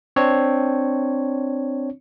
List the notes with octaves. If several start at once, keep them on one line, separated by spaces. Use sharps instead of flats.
C4 D4 C#5